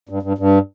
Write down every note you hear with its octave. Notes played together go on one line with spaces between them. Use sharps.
G2
G2
G2